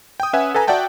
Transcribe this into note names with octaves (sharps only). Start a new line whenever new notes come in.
G5 D#6
C#4 B4 E5 F#5 G#5
A4 B4 G#5 A#5
F#4 D5 E5 F#5 G5 A5